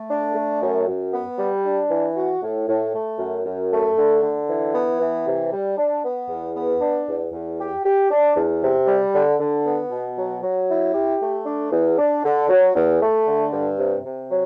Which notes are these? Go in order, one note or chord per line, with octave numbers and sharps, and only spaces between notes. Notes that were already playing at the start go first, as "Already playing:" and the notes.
Already playing: A3
D4
A3
F#2
F#2
B3
G3
D4
E3
F#4
A2
A2
A3
F#2
F#2
A3
D3
D3
E3
B3
E3
C3
G3
D4
B3
E2
B3
D4
E2
E2
G4
G4
D4
E2
C3
G3
D3
D3
B3
B2
F#3
F#3
E4
G4
A3
D4
E2
D4
D3
F#3
E2
A3
D3
G2
C3
C3
F#3